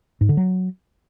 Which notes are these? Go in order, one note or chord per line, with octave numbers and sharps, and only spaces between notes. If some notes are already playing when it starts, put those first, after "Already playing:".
G#2
D3
F#3